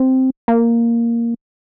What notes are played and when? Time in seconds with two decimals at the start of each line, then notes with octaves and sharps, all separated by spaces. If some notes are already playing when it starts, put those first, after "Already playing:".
Already playing: C4
0.48 A#3